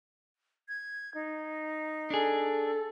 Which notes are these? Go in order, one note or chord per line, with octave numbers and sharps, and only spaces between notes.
G#6
D#4
D4 G#4 A4